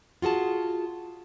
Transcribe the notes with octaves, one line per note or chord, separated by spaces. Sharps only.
F4 F#4 G#4 A5